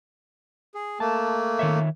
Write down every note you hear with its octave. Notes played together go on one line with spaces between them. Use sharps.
G#4
A3 A#3 A5
D#3 C#5 E5